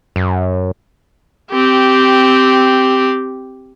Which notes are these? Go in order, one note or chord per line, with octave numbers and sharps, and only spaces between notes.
F#2
C4 G4